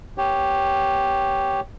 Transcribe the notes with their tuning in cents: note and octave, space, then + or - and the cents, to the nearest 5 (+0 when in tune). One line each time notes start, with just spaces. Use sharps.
B3 +0 G4 +0 C#5 +0